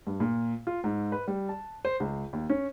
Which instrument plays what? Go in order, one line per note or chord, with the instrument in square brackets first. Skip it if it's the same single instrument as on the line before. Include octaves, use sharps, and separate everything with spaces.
[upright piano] G2
A#2
F4
G#2
B4
G3
A5
C5
C#2
D#2
C#4